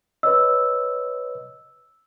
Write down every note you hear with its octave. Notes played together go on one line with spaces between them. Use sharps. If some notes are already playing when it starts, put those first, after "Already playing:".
B4 C#5 D#5 E6